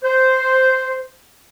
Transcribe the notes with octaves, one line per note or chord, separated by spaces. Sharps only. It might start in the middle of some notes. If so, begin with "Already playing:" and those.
C5